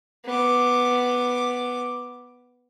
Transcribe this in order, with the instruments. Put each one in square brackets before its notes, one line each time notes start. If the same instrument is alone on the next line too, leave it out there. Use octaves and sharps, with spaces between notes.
[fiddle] B3 D6